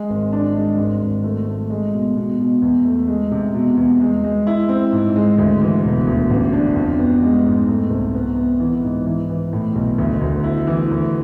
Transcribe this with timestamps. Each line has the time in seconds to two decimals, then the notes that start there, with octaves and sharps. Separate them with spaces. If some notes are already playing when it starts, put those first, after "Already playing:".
Already playing: G#3 G#4
0.10 G#1
0.33 D4
0.56 G#3
0.78 G#1
1.02 G#1
1.24 A3
1.47 A3
1.70 G#3
1.93 B2
2.16 B2
2.40 B2
2.62 E2
2.85 A3
3.08 G#3
3.31 C3
3.54 B2
3.77 E2
4.01 G#3
4.24 G#3
4.47 E4
4.69 C4
4.92 G#2
5.16 G#3
5.38 D2
5.61 E3
5.84 E1
6.07 D2
6.30 A1
6.53 D4
6.76 F2
6.99 B3
7.23 G#3
7.46 G#2
7.68 A3
7.90 C2
8.14 B3
8.36 B3
8.60 E3
8.83 G#2
9.06 E3
9.30 E3
9.53 A2
9.75 B1
9.98 D2
10.21 D2
10.44 E4
10.67 E3
10.91 D2